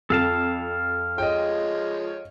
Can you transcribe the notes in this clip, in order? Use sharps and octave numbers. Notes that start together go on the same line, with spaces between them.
F2 A4 F5 A5
F3 G#3 C#5 D#5 G5